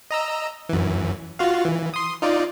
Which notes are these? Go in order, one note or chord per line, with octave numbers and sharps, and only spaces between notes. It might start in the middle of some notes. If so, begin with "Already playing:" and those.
D#5 A#5 E6
F#2 E3
F4 F#4 F5
E3
C6 D#6
D#4 F4 D5